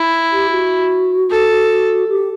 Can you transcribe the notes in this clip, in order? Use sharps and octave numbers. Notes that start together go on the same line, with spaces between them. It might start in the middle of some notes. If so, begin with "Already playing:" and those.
Already playing: E4
G4
F#4
A4
G4